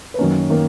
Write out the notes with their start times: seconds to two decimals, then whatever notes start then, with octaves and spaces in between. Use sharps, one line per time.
0.14 B4
0.18 F#2 D#3 A#3 C#4 C#5
0.50 D#3 A#3